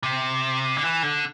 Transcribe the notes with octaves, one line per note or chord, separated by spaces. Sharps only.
C3
D3
E3
D3